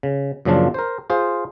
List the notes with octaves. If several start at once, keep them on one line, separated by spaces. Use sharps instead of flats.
C#3
F#2 A#2 C#3 F3 D4 F4
A#4 C5
F4 G#4 C5